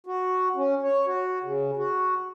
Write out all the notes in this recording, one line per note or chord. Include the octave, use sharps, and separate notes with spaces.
F#4
C#4
C#5
F#4
C#3
F#4